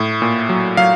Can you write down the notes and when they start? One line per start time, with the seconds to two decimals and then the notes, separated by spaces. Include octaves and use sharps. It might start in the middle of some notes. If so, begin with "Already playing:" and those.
Already playing: A2
0.22 A#2
0.49 F#3
0.77 F#3 F5